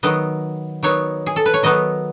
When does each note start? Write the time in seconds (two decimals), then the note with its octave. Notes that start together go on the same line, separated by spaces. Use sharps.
0.03 D#3 F#3 B3 D#4 D#5
0.83 D#3 F#3 B3 D#4 C#5
1.26 G#4
1.36 A4
1.46 B4
1.54 C#5
1.63 D#3 F#3 B3 D#4 D#5